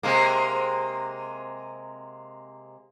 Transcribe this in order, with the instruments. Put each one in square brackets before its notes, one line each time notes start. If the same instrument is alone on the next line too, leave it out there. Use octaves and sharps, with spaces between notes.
[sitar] C3 G#3 A#3